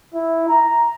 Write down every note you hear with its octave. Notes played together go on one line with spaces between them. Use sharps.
E4
A#5